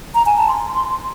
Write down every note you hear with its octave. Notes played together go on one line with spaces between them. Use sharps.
A#5
G#5
A5
C6